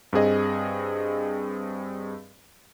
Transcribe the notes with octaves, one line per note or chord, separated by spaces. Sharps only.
G2 C4 G#4 D#5